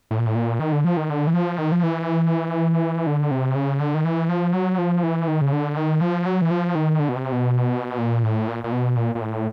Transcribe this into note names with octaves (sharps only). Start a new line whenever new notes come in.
A2
A#2
A2
A#2
D#3
D3
F3
D#3
D3
E3
F3
D#3
F3
E3
D3
C3
C#3
D3
D#3
E3
F3
F#3
F3
E3
D#3
C#3
D3
D#3
F3
F#3
E3
F3
D#3
D3
B2
C3
B2
A#2
A2
A#2
A#2
B2
A#2
A#2
A2